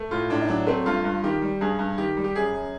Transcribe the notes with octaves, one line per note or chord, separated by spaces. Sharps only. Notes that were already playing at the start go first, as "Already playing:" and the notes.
Already playing: A3
A2 F4
A2 D4
D#4
F#3 D4
A3 C4
G2 F4
G2
D#3 G4
G3
G2 G#4
G2
D#3 G4
G3
G4
F#2 G#4
F#2